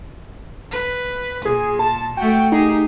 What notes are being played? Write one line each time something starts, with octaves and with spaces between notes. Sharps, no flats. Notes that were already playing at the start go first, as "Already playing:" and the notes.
B4
A#2 G#4
A5
A3 F#4 G5
D#4 G4 G#4